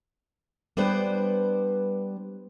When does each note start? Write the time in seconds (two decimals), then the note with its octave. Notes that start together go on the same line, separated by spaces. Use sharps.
0.77 G3 B3 D4 B4 C5